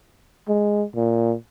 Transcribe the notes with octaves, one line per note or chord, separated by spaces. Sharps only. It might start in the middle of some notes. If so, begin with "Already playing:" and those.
G#3
A#2